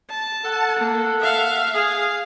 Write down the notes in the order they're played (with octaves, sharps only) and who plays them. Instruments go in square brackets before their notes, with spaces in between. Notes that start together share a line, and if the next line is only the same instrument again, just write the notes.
[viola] A5
[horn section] A4 F#5
[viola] A#3
E5 F5
[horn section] G#4 [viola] F5